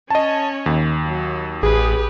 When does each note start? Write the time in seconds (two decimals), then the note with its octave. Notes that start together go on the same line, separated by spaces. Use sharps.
0.10 C#4 C#5 D#5 A5
0.66 D#2
1.05 F#3
1.63 A1 G4 G#4 B4